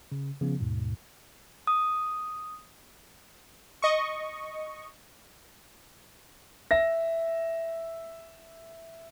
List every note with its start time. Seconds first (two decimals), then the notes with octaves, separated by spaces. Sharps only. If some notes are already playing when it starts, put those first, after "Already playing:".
0.12 C#3
0.41 C#3 F3 B3
0.60 D#2 G#2 B2
1.67 D#6
3.82 D#5 C#6
6.71 E5 A#6